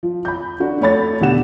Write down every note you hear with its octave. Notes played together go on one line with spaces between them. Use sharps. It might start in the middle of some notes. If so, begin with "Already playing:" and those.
F3
B5 G6
D4 F#4
A3 C#5 B5 A6
E1 D3 G4 F#5 E7